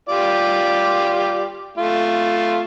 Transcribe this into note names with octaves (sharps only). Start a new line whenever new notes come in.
F4 G4 D5
A3 F4